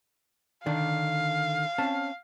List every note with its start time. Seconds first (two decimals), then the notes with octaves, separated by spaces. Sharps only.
0.66 D3 D#3 D4 F5
1.78 C4 C#4 A5